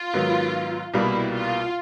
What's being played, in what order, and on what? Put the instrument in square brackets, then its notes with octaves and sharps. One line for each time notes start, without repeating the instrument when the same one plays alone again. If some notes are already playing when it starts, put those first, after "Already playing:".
Already playing: [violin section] F4
[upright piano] G#2 D#3 F#3 B3
[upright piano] C2 B2 G3 A#3 [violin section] E4
[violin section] F4